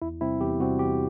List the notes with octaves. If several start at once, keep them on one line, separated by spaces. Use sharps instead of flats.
E2 E4
C3 G3 C4 E4
E2 G4
C3 G3 C4 F#4
E2 G4